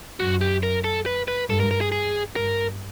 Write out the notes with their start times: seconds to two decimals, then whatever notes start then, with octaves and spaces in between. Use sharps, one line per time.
0.20 F#2 F#4
0.41 G4
0.63 A#4
0.84 A4
1.06 B4
1.28 B4
1.49 G2 A4
1.60 A#4
1.71 A#4
1.81 G#4
1.92 G#4
2.36 G2 A#4